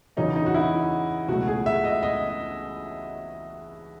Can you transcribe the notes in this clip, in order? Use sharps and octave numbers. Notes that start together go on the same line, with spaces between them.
E2 C#3 F#3 C#4 D#4
D#4
F#4
E4
C#2 B2 F#3 A3 F#4
G#4
E5
D#5
D#5